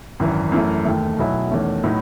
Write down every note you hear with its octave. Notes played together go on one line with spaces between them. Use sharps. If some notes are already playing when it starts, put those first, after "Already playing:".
G#1 F#2 E3
F#2 E3 A3
E1 D#2 D#3 A3
B1 B2 F#3 B3 E4
E2 D#3 A3 C#4
A2 F#3 B3 D#4